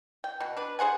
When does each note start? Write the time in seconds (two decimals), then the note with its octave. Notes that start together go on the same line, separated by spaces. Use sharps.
0.24 G5
0.40 B2
0.57 D4 B4
0.79 G#4 C5 F#5 G#5